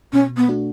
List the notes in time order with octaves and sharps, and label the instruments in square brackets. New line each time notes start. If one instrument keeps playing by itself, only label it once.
[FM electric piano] B2 [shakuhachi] C#4
[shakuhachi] B3
[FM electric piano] A3 D4 F#4